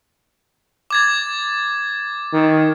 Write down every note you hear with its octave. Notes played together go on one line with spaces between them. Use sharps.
D6 G#6 A6
D#3